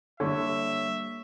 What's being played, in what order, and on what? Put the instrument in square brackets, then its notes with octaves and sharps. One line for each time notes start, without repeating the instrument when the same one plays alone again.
[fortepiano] D3 [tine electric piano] G3 C#5 [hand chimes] A#3 C#6 [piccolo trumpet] E5